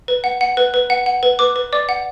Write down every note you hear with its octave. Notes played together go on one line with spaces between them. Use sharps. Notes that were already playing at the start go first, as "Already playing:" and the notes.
B4
F#5
F#5
B4
B4
F#5
F#5
B4
B4 D6
B4
D5 D6
F#5